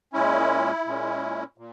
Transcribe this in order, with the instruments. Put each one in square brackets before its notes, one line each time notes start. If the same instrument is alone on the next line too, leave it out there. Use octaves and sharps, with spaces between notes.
[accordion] A#2 G#3 C#4 E4
A#2 G#3 C#4
A#2